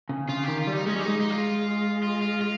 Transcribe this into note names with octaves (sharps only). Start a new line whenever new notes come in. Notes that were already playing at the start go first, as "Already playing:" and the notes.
C#3
C#3 F4
D#3 G4
F4
G3
D#4
G#3 C#4
G3
G#3 D#4
D#4
F4
F4
F4
F4